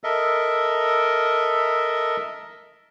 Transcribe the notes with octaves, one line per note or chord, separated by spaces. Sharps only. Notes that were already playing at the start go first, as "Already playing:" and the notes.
A4 A#4 D#5 E5